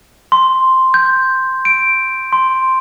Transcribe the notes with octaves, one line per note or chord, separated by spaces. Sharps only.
C6
G6
D7
C6